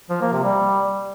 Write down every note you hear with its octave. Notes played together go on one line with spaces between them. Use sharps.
F3
A#3
C3
G3